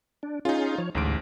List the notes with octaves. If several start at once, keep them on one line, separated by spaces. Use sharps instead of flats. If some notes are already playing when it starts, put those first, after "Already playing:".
D4
C#4 D#4 F4 G#4
F3 C#5
A1 D2 G#2 D7